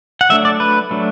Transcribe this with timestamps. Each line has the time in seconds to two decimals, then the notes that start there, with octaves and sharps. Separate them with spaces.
0.21 F#5
0.29 F#3 A3 D4 E5
0.45 D5
0.60 B4
0.91 F#3 A3 D4